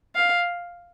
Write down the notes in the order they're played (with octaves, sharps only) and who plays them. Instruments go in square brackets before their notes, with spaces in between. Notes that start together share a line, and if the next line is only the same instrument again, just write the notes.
[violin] F5